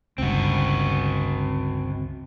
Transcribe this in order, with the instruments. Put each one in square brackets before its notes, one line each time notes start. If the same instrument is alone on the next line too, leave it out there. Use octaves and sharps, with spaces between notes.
[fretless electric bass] G1 C#2 [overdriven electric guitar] C4 F#4